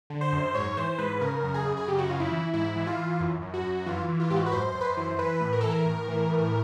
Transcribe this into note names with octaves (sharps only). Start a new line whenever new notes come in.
D3
C5
F#2
G#2 C#5
E3 C5
G#2 B4
C#3 A#4
F#2
G#4
F#2
G#4
C#3 G4
F#4
C#3 F4
E4
E3
G#2 E4
E3
F4
E3
F#2
F#2
F#4
F#2
E3 F4
E3
F4
G#2 G4
F#4
B4
F#2 C5
F#2
B4
C5
E3
E3 B4
A2
A#4
E3 A4
A#4
A2
E3
A2